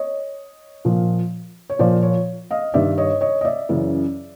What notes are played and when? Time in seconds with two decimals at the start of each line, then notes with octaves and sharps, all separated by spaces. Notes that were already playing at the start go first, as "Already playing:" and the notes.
Already playing: C#5 D#5
0.85 A#2 F3
1.70 C#5
1.79 A#2 F3 C5 D5
2.03 C#5
2.51 D#5 F5
2.74 G2 D#3 D5 E5
2.98 C#5 D#5
3.21 C#5 D#5
3.41 D#5
3.45 D5 E5
3.69 F#2 C#3 E3